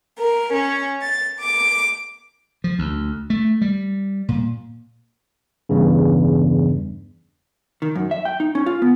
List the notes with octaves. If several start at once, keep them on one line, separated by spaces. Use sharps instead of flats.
A#4
C#4
A6
D6
F3
D2
A3
G3
A#2
E2 G2 C#3
D#3
F#2
E5
G5
D#4
C#4
F4
B3